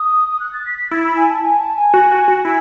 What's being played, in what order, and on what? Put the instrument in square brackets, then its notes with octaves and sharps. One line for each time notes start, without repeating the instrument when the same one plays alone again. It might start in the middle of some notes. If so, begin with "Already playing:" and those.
Already playing: [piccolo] D#6
F#6
A6
B6
B6
[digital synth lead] E4 [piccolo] A6
[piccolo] B5
G#5
A5
G#5
A5
G#5
[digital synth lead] F#4
F#4
F#4
[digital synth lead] E4 [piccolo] G#5